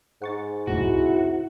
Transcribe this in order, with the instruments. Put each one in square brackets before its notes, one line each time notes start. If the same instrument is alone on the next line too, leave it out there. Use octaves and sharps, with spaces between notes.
[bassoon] G#2 [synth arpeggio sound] F#5 C#6 A6
[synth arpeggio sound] C#2 F#2 A2 [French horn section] C3 E4 [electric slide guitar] F#4